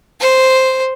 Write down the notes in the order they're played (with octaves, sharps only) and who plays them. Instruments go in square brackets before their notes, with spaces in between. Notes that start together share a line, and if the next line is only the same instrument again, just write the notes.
[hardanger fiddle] C5